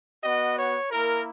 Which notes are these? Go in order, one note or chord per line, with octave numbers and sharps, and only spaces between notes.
B3 F#4 D#5
C#5
A#3 E4 A#4